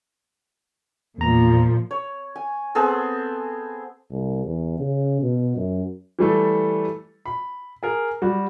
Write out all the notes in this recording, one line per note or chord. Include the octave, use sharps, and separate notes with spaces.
E2 A#2 F3 A#5
C#5
G#5
B3 C4 G#4 A4
C2
E2
C#3
B2
F#2
E3 G3 A3 A4
B5
G#4 A#4
G3 F#4